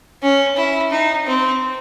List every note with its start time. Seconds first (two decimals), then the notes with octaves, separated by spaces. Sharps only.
0.23 C#4
0.57 E4
0.91 D#4
1.26 C4